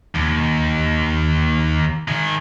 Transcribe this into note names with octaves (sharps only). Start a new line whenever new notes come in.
D#2
D#3 G#4